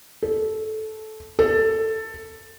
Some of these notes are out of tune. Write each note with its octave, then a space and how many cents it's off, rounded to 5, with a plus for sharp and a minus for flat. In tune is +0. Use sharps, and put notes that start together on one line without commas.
A4 -15
A4 +10